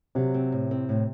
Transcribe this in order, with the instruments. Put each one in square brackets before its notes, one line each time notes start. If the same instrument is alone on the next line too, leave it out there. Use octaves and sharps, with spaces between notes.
[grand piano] C3 [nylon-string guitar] F#3
[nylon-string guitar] C4
A2
C4
A2